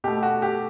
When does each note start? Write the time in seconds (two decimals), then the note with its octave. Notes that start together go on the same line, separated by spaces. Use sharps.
0.04 B2 A3 G4
0.23 F#4
0.42 G4